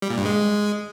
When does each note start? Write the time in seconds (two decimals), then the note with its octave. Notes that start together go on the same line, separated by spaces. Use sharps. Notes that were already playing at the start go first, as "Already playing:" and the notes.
0.02 G3
0.10 A#2
0.18 G2
0.25 G#3